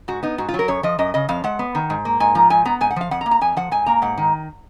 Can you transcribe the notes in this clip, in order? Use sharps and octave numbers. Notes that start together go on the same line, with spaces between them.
G#2 F#4
B3 D#4
G#2 F#4
F4
F#3
A#4
F#2 C#5
F3 D#5
F#2 D#5
C#3 D#5
F2 F5
G#3 F#5
B3
D#3
G#2
A#3
G#2 G#5
F3 A#5
G#2 G#5
B3 A#5
G#2 G#5
F#5
F3 F5
F2 F#5
A#5
A#3
A#5
F2 G#5
F3 F#5
G#2 G#5
A#3 A#5
G#2 F#5
D#3